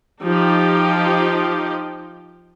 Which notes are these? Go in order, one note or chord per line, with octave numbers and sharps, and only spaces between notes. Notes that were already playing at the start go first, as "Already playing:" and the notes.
F3 D#4 G4